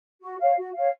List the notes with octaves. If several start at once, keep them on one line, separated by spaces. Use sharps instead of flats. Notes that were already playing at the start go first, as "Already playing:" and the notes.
F#4
C#5 F5
F#4
C#5 F5